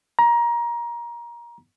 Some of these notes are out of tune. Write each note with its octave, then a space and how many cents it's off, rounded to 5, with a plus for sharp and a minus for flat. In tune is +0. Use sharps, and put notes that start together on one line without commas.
A#5 +20